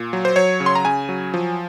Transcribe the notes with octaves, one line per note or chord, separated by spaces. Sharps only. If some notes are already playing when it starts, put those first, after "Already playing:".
Already playing: A#2
F#3
C5
F#3 C#5
C#3
C6
A#5
C#3 G#5
F#3
F3